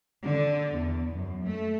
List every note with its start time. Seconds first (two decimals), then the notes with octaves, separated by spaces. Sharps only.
0.25 D3
0.78 E2
1.15 F#2
1.46 A3